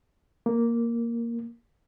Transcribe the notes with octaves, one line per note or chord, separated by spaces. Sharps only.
A#3